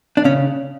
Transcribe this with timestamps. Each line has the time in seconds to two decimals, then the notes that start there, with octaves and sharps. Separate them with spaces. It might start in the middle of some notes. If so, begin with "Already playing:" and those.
0.17 D4
0.24 C#3 C#4